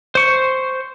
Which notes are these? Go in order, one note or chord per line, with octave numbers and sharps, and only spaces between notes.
C5 C#6